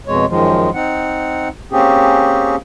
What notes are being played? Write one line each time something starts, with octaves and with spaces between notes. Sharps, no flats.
F2 B2 G#3 C#5
F#2 D#3 F3 G#3
C4 D#4 F#5
A#3 C4 C#4 G4 G#4